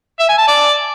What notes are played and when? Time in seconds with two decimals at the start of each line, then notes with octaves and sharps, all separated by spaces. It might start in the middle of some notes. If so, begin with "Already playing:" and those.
0.19 E5
0.29 G#5
0.38 A5
0.47 D5